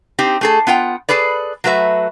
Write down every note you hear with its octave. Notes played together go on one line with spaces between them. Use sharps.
C4 D#4 G4
A3 G#4 A4
B3 F4 F#5 G5
G#4 A4 B4 D5
F#3 A3 F#4 B4 E5